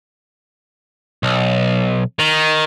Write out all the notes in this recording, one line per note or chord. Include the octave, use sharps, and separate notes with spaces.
B1
D#3